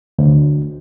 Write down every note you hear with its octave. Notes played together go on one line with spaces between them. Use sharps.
D2